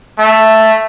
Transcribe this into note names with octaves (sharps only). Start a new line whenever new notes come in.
A3